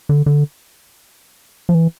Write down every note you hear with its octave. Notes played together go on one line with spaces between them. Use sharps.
D3
D3
F3
E3